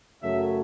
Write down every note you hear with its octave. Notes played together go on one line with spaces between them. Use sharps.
F#2 C#3 F#3 A3 E5